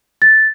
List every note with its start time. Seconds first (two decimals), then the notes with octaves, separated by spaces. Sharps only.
0.22 A6